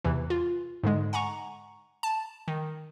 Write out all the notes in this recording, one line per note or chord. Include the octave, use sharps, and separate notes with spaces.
E2 C3 E3
F4
G#2 D3 G#3
F#5 G#5 A#5 C#6
A5
D#3